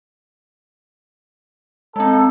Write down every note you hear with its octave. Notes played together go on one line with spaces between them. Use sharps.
G#3 C4 D#4 A4